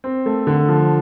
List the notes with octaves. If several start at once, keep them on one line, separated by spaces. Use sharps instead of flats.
C4
A3
D3
F3